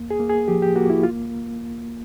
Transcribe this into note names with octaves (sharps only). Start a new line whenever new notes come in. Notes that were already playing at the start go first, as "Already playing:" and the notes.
Already playing: E2 A#3
G#4
A#3
G#4
F3 G4
G4
A#3 F#4
E4
C#2 F4